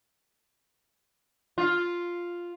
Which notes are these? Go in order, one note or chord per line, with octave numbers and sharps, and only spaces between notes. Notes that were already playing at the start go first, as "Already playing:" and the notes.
F4